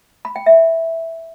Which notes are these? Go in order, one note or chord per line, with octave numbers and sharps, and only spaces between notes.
B5
G5
E5